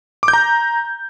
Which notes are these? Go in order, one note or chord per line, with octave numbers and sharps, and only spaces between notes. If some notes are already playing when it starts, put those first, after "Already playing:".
D6
G6
A#5